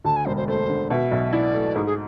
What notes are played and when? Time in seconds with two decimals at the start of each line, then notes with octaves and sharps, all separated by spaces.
0.04 D2 A5
0.16 G#5
0.26 E1 C5
0.36 C5
0.48 A3 C5
0.69 D3
0.90 B2 E5
1.12 B1
1.32 E4 D5
1.54 A3
1.76 G#2 G#4
1.86 G#4